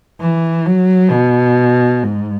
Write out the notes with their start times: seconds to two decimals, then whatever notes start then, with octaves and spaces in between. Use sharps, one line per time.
0.21 E3
0.66 F#3
1.11 B2
2.03 G#2